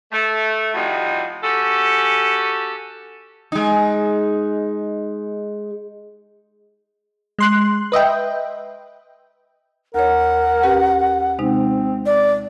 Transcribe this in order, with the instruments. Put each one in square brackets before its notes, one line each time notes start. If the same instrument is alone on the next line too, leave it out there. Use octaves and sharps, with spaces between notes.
[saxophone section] A3
A2 C3 F3 G3 D#4 F#4
C#4 F#4 G4 A4
[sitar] G#3 D#4
[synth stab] G#3 C6 F#6
B4 D#5 E5 G5
[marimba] D#2 C#5 [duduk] A#4 [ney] F#5
[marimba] C#4 G4 B4
[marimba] C3 G#3 D#4 [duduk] C4
[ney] D5